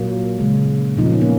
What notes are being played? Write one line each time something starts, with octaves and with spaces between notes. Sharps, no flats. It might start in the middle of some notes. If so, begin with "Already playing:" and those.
Already playing: A#2 F#3 A#3
C#3 G#3
A#2 F3 A#3 D#4
C#4
B3
A#3 C#4